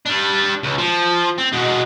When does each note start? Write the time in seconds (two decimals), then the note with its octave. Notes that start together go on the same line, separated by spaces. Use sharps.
0.06 G3 D4
0.63 C#2
0.78 F3
1.38 C4
1.53 B2 G#3